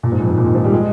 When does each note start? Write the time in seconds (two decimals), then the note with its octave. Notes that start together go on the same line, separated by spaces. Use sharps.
0.03 A#2
0.12 G#2
0.21 F2
0.29 G#2
0.38 A#2
0.46 D#3
0.55 F3
0.64 G3
0.72 G#3